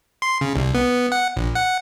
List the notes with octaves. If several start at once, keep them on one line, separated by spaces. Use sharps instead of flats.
C6
C#3
C2
B3
F#5
A#1
F#5